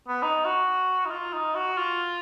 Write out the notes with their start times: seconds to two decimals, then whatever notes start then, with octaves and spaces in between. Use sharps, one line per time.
0.08 B3
0.22 D#4
0.45 F#4
1.06 D#4
1.11 F4
1.33 D#4
1.55 F#4
1.77 F4